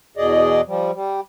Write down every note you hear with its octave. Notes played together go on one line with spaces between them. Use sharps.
E2 B2 G#4 D5 D#5
F3 G3
G3